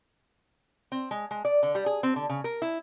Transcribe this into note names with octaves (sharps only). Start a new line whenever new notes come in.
C4
G#3
G#3
D5
D3
G3
G#4
C4
D3
C#3
A#4
E4